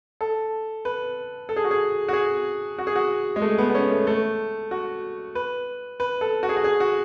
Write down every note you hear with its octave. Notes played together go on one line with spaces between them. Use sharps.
A4
B4
A4
G#4
F#4
G#4
F#4
G#4
F#4
G#4
F#4
G#3
A3
B3
B3
C#4
A3
A3
F#4
B4
B4
A4
F#4
G#4
F#4
G#4
F#4